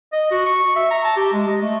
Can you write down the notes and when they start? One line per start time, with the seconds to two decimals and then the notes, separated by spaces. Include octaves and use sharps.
0.12 D#5
0.31 F#4
0.46 C#6
0.76 E5
0.91 A#5
1.04 A5
1.16 G4
1.33 G#3
1.47 D#5
1.61 A3